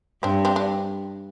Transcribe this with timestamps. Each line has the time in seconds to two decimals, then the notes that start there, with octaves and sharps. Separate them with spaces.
0.23 G2 C4 D4
0.45 C4 D4
0.56 D4